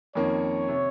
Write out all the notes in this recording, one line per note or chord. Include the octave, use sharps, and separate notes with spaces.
F2 D#3 A#3 C#4 C#5
C3